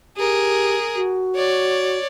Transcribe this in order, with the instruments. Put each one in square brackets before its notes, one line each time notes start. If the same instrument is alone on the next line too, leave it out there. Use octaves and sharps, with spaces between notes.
[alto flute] G4 [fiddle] G#4 A#4
[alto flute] F#4
[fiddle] C#5 D5